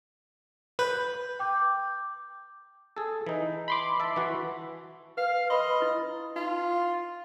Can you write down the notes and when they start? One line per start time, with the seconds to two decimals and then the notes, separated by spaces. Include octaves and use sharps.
0.79 B4 G6
1.39 G5 D6 G6
2.97 G#4 A4
3.26 E3 D#4
3.68 B5 C6 D6
4.00 E5 A5
4.16 E3 F#4
5.17 B4 F5
5.50 B4 D#5 B5 C6
5.80 E4 F4
6.36 D#4 F4